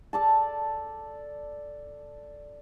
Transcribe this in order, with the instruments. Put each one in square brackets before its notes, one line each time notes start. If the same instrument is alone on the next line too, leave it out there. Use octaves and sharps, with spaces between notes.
[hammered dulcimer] A4 D5 A5